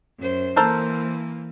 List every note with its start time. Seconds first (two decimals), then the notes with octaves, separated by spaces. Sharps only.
0.19 F#2 C5
0.56 E3 A#3 A4 A#4 C5